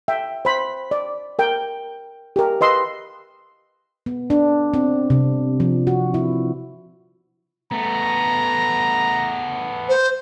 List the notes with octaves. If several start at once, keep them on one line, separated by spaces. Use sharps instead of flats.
E5 G5
C5 B5
D5
A#4 G5
G4 A#4
B4 D#5 C6 E6
B3
D4
C4
C3
F3
F#4
E4
A3 B3 A#5
C5